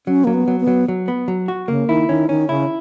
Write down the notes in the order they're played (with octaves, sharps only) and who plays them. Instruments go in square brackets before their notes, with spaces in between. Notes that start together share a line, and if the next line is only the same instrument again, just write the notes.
[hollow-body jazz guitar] F#3 [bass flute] C#4
[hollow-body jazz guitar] F#3 [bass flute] A#3
[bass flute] B3
[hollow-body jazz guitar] F#3
[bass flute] B3
[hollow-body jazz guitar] F#3
F#3
B3
F#3
F#4
[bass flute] C#3 [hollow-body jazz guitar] A#3
[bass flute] D#3 [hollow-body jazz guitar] E4
[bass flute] D#3 [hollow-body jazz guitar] C#4
[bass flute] D#3 [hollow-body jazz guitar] C#4
[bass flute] C#3 [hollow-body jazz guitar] E4